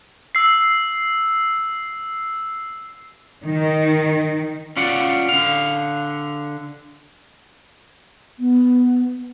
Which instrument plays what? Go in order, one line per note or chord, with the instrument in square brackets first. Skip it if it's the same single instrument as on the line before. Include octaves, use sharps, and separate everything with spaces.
[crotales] E6 C7
[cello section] D#3
[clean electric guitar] C#4 F4 D5 F#5
D3 F5
[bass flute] B3